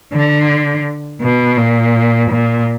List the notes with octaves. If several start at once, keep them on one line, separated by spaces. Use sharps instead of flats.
D3
B2
A#2
A#2